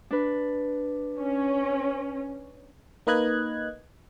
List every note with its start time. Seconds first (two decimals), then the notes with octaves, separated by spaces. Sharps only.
0.11 D4 B4
1.19 C#4
3.07 A#3 D#4 B4 D#5 F#6 G#6